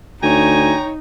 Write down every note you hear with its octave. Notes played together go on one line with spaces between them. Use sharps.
D2 D#4 C#5 G5 G#5 A#5